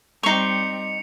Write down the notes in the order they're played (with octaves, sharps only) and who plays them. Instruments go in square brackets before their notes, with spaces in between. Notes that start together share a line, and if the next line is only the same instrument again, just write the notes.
[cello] G3 C4 [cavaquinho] D#4 C#6 [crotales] C7 C#7 F7